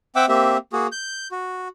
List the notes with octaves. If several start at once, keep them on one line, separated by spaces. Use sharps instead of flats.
C4 E5 F#5 G5 D6 E6
A#3 C4 G4 E5
A#3 F#4 G#4
G6
F#4